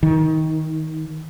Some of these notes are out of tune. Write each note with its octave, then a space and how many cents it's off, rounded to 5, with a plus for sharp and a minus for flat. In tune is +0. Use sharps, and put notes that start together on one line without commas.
D#3 +20